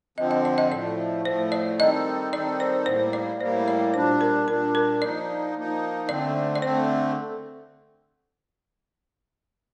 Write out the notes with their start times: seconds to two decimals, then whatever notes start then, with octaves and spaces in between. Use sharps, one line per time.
0.18 D3 F3 C4 D#5
0.31 D#5
0.45 D5
0.58 D#5
0.72 A2 F3 A3 D5
1.25 A2 F3 A3 C5
1.52 D5
1.79 D#3 G3 C4 D#4 A4 D#5
2.32 D#3 G3 C4 D#4 A4 D5
2.60 C5
2.86 A2 G3 A#3 C5
3.13 D5
3.40 A2 G3 A#3 C5
3.68 D5
3.94 A#2 G3 D4 C5
4.21 A#4
4.47 A#2 G3 D4 A#4
4.75 A#4
5.01 F3 A#3 D#4 D5
5.55 F3 A#3 D#4
6.09 D3 A3 C4 D5
6.56 D5
6.62 D3 A3 C4 C5